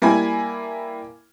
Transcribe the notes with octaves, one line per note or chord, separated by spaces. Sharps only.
G3 A#3 E4 G#5 B5 G#6